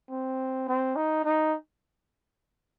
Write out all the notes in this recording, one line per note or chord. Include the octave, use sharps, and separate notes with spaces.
C4
C4
D#4
D#4